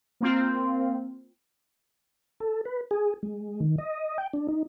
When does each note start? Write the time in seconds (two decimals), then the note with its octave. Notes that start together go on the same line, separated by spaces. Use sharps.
0.21 A#3 C4 F4
2.40 A4
2.65 B4
2.91 G#4
3.23 G#3
3.60 D#3
3.78 D#5
4.18 G5
4.33 D4
4.48 D#4